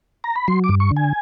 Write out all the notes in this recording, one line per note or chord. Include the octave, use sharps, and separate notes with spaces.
A#5
B5
F#3 C6
D6
G2
C#6
D3
G#5